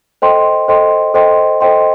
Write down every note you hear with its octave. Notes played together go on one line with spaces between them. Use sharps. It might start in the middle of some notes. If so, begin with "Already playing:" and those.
A4 C5 D#5 G5 C6
A4 C5 D#5 G5 C6
A4 C5 D#5 G5 C6
A4 C5 D#5 G5 C6